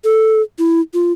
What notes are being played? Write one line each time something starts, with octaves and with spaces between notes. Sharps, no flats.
A4
E4
F4